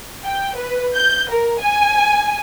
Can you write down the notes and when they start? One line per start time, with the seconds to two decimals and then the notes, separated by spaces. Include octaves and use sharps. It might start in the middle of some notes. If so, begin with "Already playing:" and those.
0.24 G5
0.56 B4
0.94 G6
1.31 A#4
1.60 G#5